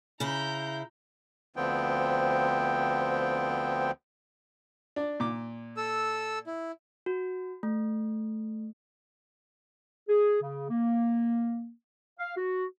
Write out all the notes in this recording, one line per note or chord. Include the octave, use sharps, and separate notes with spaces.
C#3 E4 A#5 G6
D2 D3 F3 B3 C4 G5
D4 D5
A#2 D6
A4 E6
E4
F#4
A3
G#4
C#3
A#3
F5
F#4